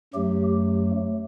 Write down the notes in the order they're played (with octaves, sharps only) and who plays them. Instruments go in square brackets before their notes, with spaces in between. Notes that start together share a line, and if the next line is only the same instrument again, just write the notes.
[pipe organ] F#2 F#3 A3 G4